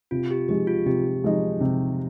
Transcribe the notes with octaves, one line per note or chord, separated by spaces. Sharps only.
C3 F4
G4
F3 G#3 D#4 G4
F4
C3 G4
F3 G#3 D#4
C3